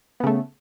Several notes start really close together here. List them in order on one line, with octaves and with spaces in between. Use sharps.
B3 C#3 A3